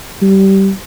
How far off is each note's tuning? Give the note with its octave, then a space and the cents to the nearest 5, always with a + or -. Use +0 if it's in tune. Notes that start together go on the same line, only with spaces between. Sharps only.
G3 -20